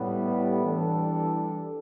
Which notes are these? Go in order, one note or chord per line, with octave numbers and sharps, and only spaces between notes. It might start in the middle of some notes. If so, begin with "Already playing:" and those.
Already playing: A2 G3 B3
E3 G3 D4 A4